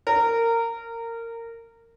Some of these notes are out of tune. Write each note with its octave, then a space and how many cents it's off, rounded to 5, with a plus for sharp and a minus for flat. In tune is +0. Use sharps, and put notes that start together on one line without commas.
A#4 -20